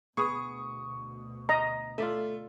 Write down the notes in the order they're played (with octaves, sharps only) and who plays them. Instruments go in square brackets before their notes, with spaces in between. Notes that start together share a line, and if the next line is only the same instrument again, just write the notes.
[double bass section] D2 B2 [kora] B3 G#4 [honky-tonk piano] C#6 D#6
[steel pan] D#5 A#5
[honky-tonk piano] A3 [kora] F4 D5 E5